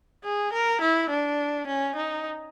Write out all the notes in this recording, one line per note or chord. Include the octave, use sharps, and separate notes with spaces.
G#4
A#4
E4
D4
C#4
D#4